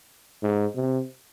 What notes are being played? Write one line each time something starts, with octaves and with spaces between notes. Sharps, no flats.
G#2
C3